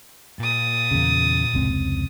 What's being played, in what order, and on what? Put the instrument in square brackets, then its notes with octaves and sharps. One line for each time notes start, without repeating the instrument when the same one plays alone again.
[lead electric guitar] A#2 [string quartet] D#6 A6
[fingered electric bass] E2 C#3
F1 C#2 C4